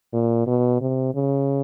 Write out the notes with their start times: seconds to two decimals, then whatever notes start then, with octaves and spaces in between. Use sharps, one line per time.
0.13 A#2
0.47 B2
0.81 C3
1.14 C#3